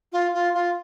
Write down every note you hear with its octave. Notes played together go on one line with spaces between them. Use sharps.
F4
F4
F4